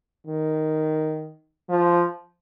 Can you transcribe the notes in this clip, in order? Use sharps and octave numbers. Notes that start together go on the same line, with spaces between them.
D#3
F3